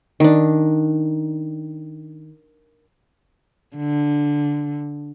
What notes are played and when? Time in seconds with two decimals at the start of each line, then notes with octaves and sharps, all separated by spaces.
0.20 D#3 D4
3.76 D3